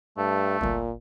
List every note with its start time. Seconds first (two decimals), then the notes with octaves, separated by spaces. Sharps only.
0.18 G2 A3
0.61 G1 C2 A#2